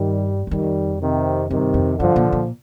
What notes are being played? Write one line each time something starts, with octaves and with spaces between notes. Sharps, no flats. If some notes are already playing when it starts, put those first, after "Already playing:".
Already playing: G2 D#3 G3
G2
F2 D#3 G3
C3 D#3
G2 C3 D#3
F2
G2 D3 F3
A#2
A#2